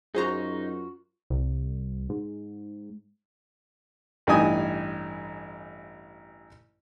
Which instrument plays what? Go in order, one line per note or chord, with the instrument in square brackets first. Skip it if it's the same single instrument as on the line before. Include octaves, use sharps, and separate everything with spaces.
[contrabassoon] F#2 [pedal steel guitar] D#4 [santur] F4 F#4 F#5 [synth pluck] G#4 C5 A#5
[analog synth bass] C2
G#2
[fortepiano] A1 G2 E3 D#4 G#5 D#6